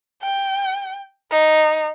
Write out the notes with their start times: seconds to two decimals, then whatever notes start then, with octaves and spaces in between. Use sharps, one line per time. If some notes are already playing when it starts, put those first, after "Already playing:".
0.23 G5
1.31 D#4